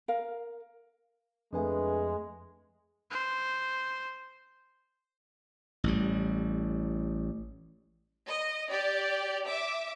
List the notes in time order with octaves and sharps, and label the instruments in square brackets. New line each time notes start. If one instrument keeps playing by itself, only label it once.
[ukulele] A#4 F5
[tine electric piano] F2 A3 [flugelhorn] G#3 [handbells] D4 B4 G#5
[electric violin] C5
[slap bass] A1 A2 G3
[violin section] D#5
G4 D5
E5 D6